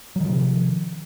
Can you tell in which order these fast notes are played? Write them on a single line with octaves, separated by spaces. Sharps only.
F#3 D#3 F3 C3